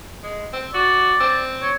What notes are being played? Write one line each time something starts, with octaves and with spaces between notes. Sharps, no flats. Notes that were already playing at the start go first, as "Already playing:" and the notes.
G#3
C4
F#4 D5
C4
C#5